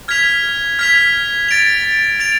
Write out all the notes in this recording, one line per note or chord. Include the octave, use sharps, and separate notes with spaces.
F6 G#6 B6 F7
F6 G#6 B6 F7
A6 D7 F7
A6 D7 F7